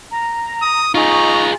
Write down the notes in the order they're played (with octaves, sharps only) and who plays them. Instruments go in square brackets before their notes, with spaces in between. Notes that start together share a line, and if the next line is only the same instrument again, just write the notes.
[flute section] A#5
[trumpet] D#6
[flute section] D#4 C#6 [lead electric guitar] F4 G#4 [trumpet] A#5